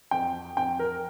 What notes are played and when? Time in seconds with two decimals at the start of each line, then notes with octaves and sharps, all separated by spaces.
0.11 F2 G5
0.57 F2 G5
0.79 A#4